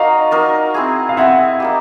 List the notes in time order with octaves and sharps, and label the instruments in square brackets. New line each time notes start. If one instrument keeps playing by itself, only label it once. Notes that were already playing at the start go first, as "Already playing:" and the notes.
Already playing: [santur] D#4 F#4 A#4 D5 [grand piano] D#5 F5
[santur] D#4 F#4 A#4 D5
C4 E4 G#4
[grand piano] F5
[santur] C4 E4 G#4 [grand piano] E5 F#5
[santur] A#3 D#4 G4